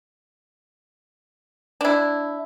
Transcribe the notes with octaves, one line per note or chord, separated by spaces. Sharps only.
D4 E4